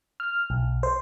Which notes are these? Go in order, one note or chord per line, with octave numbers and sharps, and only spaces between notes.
F6
B1
C5